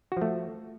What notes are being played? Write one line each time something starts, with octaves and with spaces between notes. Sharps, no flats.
F3 A3 F#4